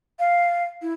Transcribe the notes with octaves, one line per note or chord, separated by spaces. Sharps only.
F5
E4